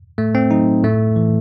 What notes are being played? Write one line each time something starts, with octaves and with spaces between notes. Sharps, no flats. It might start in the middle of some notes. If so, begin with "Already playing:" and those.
A2 A3
C4
F#3 D#4
A2 A3
E3